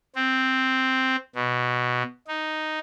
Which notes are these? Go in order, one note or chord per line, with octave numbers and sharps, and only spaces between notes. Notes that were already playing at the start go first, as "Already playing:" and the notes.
C4
B2
D#4